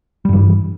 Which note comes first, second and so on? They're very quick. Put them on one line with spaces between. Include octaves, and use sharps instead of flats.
G3 G2 E3